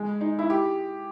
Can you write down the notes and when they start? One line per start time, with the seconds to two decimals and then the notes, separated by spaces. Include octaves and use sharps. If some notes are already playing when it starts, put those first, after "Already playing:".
Already playing: G#3
0.21 D#4
0.39 E4
0.50 G4